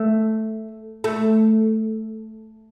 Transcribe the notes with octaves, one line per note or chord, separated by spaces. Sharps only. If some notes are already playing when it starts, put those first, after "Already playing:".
Already playing: A3
A3